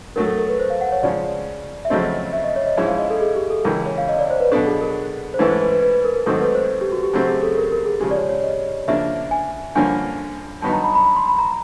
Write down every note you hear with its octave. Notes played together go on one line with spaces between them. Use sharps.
A2 F#3 A3 A#4
A4
A#4
B4
C5
F5
F#5
C#5
C#3 F3 G#3 C#4 D5
E5
F2 C#3 F#3 A3 C4 D#5
E5
D#5
C#5
D#5
G#2 F3 G#3 C#4 E4 E5
F5
D#5
A4
G#4
G4
A4
C#2 C#3 E3 A#4
C#5
F5
D#5
D5
C5
B4
B2 F#3 B3 D4 A4
G#4
A#4
C5
G#2 E3 A3 C#4 E4 B4
C5
B4
B4
B4
B4
A#4
A#4
G#2 D#3 F#3 A3 C4 A4
B4
C5
G4
F#4
G4
F#2 C#3 F#3 A3 C4 G4
G#4
A4
A#4
A#4
G#4
C#3 F3 G#3 G4
D5
C#5
C#5
D#5
C#3 F3 A#3 D4 E5
G#5
G2 D3 F3 A#3 C#4 G#5
G2 D#3 F#3 B3 D#4 A5
A#5
B5
B5
B5
C6
B5
A#5